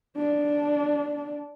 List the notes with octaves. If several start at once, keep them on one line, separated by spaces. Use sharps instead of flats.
D4